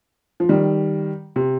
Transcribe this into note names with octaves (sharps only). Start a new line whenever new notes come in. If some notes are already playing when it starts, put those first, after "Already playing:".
F3
D#3 G3
C3